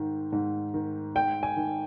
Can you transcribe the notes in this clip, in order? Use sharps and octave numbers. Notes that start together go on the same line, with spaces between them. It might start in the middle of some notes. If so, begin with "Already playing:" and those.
Already playing: G#2 D#3
G#2
D#3
G#2 G5
G#5
D#3